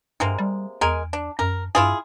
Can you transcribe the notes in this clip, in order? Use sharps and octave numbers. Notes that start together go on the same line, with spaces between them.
G2 C3 G#3 A#3
G3
E2 G#3 A#4 G#5
D4
F#2 A#4
G2 E4 F4 G#4